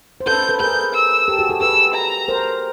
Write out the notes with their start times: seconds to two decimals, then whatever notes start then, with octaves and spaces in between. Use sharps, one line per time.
0.21 C5
0.26 A4 B4 G6
0.49 A4 B4
0.60 G#4 A#4 G6
0.95 E6
1.28 G4 A4
1.39 F#4 G#4
1.50 G4 A4
1.61 A4 B4 E6
1.94 A#5
2.28 A#4 C5